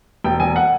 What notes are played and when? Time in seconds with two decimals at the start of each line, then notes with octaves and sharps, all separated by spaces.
0.24 E1 G5
0.40 E1 G#5
0.56 F#5